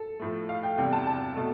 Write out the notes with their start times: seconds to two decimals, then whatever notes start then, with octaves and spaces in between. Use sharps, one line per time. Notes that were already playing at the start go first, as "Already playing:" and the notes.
Already playing: A4
0.20 A2 F3 A3
0.49 F5
0.63 G5
0.78 E2 C3 G3 G5
0.93 A5
1.07 A5
1.36 B2 A3